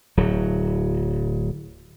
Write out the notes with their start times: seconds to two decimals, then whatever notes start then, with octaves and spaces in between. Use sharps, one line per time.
0.17 D1 F#3